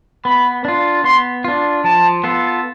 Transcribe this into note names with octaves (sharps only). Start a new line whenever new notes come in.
B3 B5
D4 F4
B3 C6
D4 F4
F3 A5
B3 F4 A4